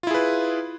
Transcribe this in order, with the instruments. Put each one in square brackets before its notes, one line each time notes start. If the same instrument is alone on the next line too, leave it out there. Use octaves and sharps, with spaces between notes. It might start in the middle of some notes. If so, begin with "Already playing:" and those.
[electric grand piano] F4
E4
G#4
B4